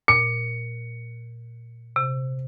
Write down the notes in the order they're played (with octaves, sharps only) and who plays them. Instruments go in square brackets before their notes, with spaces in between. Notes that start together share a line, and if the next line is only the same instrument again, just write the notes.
[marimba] A#2 [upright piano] C#7
[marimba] C3